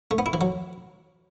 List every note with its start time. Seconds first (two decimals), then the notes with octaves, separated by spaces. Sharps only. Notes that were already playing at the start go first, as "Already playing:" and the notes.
0.11 A3
0.18 B3
0.26 E4
0.33 E3
0.41 F#3